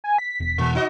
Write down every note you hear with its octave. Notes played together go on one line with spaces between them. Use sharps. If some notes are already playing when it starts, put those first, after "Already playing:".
G#5
B6
E1
E2 B2 E3 G#3
D#4 F#4 D#5